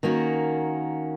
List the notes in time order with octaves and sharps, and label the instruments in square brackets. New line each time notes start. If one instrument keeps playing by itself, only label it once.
[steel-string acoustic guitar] D#3 A#3 C#4 F#4